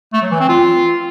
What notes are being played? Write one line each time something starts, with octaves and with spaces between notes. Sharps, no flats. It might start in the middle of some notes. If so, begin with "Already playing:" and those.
A3
F#3
E3
C4
F4